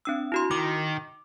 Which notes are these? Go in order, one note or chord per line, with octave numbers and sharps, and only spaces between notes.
C4 D4 E6
E4 F#4 C6
D#3 D6